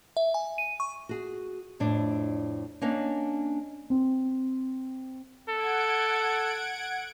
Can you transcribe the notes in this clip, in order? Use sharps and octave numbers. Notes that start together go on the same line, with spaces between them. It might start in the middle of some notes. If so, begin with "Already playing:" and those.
E5
G#5
D#7
C#6
F#4 G#4
F2 A2 D4
A#3 C#4 D4 C#5 D#5
C4
A4 F#5 G#6 D7